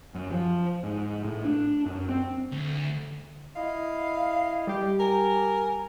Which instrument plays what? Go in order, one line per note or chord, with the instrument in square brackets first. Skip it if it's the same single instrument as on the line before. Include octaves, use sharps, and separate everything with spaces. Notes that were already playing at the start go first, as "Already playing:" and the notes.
[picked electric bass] F#2
F3
G#2
A2
D4
F#2
C4
[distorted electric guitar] D2
[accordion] E4 D#5 [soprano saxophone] F5
[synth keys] G3 G4
[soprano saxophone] A#4 [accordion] G#5